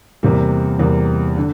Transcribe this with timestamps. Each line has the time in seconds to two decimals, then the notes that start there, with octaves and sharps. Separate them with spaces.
0.23 E2 C3 G3 A#3
0.79 E2 C3 G3 A#3
1.37 D3